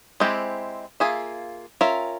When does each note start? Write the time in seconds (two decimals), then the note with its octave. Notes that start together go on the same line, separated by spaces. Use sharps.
0.20 G#3 C4 E4 G4
1.00 A#3 F4 G#4 E5
1.81 C#4 F4 A#4 E5